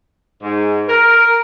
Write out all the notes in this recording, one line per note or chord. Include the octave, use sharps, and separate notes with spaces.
G#2
A#4